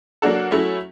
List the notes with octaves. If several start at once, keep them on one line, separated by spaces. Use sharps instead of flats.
F#3 A#3 D4 F#4 A4
F#3 A3 C#4 E4